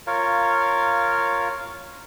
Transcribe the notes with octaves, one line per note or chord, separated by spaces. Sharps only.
F4 A#4 C#5 F5